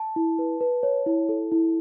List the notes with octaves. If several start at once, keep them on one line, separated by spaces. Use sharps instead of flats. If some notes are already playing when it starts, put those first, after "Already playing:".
Already playing: A5
E4
B4
B4
C#5
E4
A4
E4